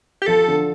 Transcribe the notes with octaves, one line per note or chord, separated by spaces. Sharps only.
G4
F3 A4
D3